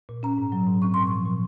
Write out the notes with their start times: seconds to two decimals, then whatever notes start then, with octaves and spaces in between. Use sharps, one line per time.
0.09 A#2
0.23 C#4 A#5
0.38 G#2
0.52 F#3
0.67 G#2
0.82 C4 C#6
0.94 A#2 C6
1.07 F3 C#6
1.26 A#2